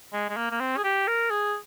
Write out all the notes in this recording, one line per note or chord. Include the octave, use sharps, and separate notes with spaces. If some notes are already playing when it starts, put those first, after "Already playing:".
G#3
G#3
A#3
A#3
C4
G#4
G4
A#4
G#4